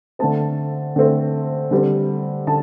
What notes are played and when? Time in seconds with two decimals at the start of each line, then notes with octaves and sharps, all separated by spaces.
0.19 D3 A3 C4 A5
0.96 D3 A3 C4
1.71 D3 G3 C4
2.47 D3 A5